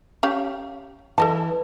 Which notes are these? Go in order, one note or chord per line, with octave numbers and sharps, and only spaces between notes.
C#4 G4 F5
E3 A4 D#5 A5